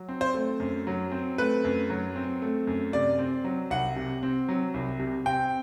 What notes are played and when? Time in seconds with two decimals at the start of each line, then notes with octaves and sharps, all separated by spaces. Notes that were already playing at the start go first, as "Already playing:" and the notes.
Already playing: F#3
0.09 C4
0.21 C5
0.35 A3
0.60 F#2
0.87 F#3
1.12 C4
1.38 A3 B4
1.64 F#2
1.90 F#3
2.16 C4
2.42 A3
2.67 F#2
2.93 C3 D5
3.18 C4
3.44 F#3
3.70 C2 F#5
3.96 C3
4.23 C4
4.48 F#3
4.74 C2
4.99 C3
5.26 C4 G5